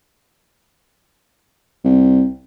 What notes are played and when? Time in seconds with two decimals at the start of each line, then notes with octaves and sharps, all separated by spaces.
1.84 C2